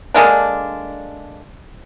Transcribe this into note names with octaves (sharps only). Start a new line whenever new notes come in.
D3 G#3 A#3 D4